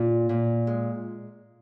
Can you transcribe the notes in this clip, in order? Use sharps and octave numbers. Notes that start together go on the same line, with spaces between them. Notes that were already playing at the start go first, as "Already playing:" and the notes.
Already playing: A#2 F4
A#2
G#3